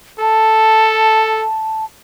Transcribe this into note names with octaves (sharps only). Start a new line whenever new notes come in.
A4 A5